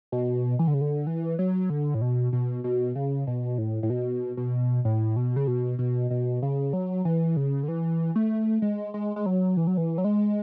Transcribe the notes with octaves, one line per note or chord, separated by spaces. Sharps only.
B2
E3
D3
C#3
D3
E3
F#3
D3
A2
B2
B2
B2
C#3
B2
A2
A2
B2
B2
A2
B2
C#3
B2
B2
B2
C#3
F#3
E3
C#3
D3
E3
A3
G#3
G#3
G#3
F#3
E3
F#3
E3
F#3
G#3